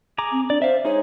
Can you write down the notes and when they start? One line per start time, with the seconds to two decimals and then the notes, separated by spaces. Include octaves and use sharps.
0.18 G#4 A#5 D6
0.32 C4
0.50 D4 D5
0.62 C5 E5 F5
0.85 G#3 D#4 G#4 C#5